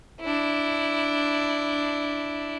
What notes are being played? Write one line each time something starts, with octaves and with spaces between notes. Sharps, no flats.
D4 E4